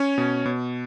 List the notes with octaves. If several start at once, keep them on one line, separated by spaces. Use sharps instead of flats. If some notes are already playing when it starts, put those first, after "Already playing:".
Already playing: C#4 C#5
B2
B2